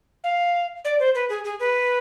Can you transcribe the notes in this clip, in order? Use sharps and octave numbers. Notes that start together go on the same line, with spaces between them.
F5
D5
C5
B4
G#4
G#4
B4